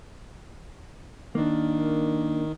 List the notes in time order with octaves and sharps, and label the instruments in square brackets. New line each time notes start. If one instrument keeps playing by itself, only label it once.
[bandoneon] D#3 [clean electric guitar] A#3 D4